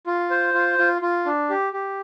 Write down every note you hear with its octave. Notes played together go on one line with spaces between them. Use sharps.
F4
C5
F4
F4
F4
D4
G4
G4